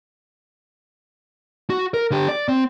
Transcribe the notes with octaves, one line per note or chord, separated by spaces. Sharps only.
F#4
A#4
D3 G4
D5
C4